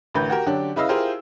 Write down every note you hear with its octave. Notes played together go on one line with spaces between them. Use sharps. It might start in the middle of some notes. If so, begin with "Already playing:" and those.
A1 D3 A#4 B4 G6
F#4 G4 A#4
D3 F#3 C#4 D4 G4
C#3 E4 B4 D#5 F5 E6
E4 F4 G4 G#4 A#4 C5